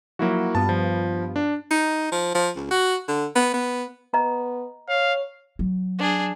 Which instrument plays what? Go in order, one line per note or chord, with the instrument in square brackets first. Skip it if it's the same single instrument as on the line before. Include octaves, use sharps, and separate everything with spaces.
[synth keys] F3 F#3 [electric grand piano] A#3 E4 F#4
[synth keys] G2 B3 F4 [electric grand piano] A5
[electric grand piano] F3
D4
[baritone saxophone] D#4
F3
F3
C#2
F#4
D3
B3
B3
[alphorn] B3 [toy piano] D#5 A#5
[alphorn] C#5 [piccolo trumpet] F5
[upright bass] F#3
[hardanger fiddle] D4 G#4